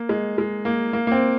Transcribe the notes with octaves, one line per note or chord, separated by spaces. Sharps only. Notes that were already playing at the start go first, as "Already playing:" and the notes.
Already playing: A#3
G#3
G#3
A#3
A#3
A#3
C4